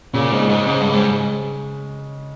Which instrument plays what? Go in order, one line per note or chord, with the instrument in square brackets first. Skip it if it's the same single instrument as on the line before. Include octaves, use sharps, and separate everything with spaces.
[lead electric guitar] A#2 [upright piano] C#3
[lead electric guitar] G#2
[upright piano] G#3
[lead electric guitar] G#2
[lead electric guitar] G#2 [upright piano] C#3
[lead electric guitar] G2
[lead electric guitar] G#2 [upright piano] G#3